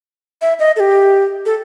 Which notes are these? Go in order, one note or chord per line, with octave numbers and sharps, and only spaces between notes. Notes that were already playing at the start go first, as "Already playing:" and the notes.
E5
D#5
A4
G4
A4